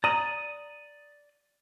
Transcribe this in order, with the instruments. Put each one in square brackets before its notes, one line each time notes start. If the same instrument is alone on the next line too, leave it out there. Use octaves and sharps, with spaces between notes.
[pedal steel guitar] D5 D#6 [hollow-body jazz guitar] A#5